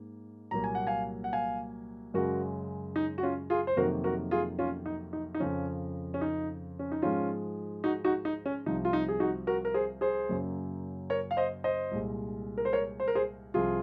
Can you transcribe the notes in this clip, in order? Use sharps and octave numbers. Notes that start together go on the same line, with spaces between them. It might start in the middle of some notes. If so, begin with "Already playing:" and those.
Already playing: G#2 A#3
C2 A#2 F#3 A#3 A#5
G#5
F#5
F5 G#5
F#5
F5 G#5
F#2 C#3 G#3 F#4 A#4
D#4
F#4
C#4 F4
F4 G#4
C5
F2 C3 D#3 F#3 A#3 F#4 A#4
F#4 A#4
F4 G#4
C#4 F4
D#4
D#4
D#4
F2 C#3 F3 C#4
C#4
D#4
C#4
D#4
G#2 F3 G#3 C#4 F4
D#4 F#4
D#4 F#4
D#4
C#4
C2 C3 F3 D#4
F4
D#4
G#4
D#4 F#4
F#4 A#4
A#4
G#4 C5
G#4 C5
F#2 C#3 F#3 A#3
A#4 C#5
F5
C5 D#5
C5 D#5
C2 A#2 G#3
A#4
C5
A#4 C#5
C5
A#4
G#4 C5
C2 C3 F3 F4 G#4